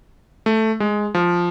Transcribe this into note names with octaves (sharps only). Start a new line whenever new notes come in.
A3
G#3
F3